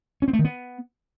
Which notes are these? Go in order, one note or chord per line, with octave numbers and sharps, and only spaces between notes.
C#4
C4
A3
D#3
B3